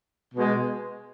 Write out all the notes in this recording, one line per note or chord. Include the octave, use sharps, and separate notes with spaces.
B2 G#3